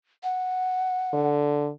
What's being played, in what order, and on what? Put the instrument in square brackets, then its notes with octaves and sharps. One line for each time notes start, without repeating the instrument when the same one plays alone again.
[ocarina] F#5
[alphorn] D3